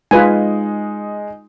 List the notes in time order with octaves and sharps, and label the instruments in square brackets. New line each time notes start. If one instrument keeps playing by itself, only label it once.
[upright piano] G#3 D#4 [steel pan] F4 B4 G#5